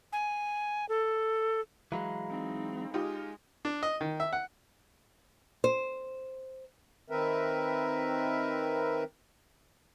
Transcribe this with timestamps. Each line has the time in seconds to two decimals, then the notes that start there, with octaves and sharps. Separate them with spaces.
0.13 G#5
0.89 A4
1.92 E3 F#3 G#3 F5 A#5 B5
2.29 C4 D#4
2.94 G#3 D#4 F4 G4
3.65 D4
3.83 D#5
4.01 D#3
4.20 E5
4.33 F#5
5.64 C5
7.10 D#3 C4 A#4 B4 E5